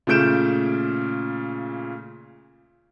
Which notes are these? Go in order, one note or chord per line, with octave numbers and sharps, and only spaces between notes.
A#2 C#3 A3 G6 D7 E7